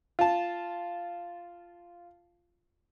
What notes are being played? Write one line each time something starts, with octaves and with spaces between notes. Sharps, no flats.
F4 A5